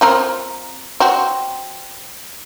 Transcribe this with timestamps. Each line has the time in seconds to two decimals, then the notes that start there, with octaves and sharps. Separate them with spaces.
0.01 F3 C4 A#4
1.00 C4 F#4